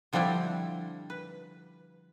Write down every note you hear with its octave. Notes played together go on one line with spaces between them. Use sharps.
D3 F3 G3 C4 D4 E4
B4